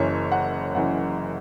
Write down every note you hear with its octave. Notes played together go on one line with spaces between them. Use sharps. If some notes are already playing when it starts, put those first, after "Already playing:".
Already playing: F#1 F#2 E3 C#5
F#5
F#1 F#2 E3 F#5